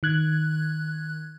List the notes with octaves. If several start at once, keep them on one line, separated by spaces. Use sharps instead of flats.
D#3 F#6 G#6